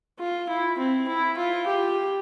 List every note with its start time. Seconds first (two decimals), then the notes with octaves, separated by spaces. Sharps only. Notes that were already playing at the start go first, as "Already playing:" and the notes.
0.19 F4
0.49 E4
0.78 C4
1.08 E4
1.37 F4
1.67 G4